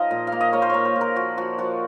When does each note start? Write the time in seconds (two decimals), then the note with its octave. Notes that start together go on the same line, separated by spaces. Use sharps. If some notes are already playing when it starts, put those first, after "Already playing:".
Already playing: F3 D#4 C5 D#5 F5
0.11 A#2
0.27 F5
0.32 A#3
0.41 D#5
0.53 A#3 C#5
0.62 C5
0.70 A#3 C#5
0.85 C5
0.95 A#2
1.01 A#4
1.16 F3 F#4
1.37 F3 F#4
1.58 F3 F#4